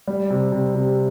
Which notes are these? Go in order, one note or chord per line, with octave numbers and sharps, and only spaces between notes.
G3
C3
C3
C3